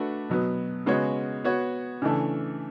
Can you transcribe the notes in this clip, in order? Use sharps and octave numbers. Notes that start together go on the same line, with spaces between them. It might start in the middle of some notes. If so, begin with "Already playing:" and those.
Already playing: A3 D4 F#4 B4
B2 F#3 B3
C#3 G#3 B3 F#4 C#5
B3 F#4 C#5
C#3 E3 A3 D4 A4